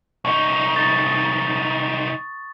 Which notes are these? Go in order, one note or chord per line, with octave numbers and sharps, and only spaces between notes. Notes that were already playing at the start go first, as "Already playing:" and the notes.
C2 D#4 C#6
C#6 D#6 A6